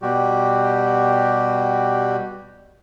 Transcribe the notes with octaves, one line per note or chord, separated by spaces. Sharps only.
B2 G3 F#4 G4